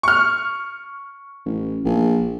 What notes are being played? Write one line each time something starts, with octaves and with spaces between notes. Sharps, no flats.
C#6 F6
A1
A#1